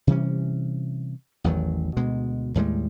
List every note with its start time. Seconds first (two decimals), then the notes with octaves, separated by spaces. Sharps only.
0.07 C3 E3 G3 C#4
1.44 A1 E2 D#3 F#3
1.97 D2 B2 G#3
2.55 D#2 A2 G3 G#3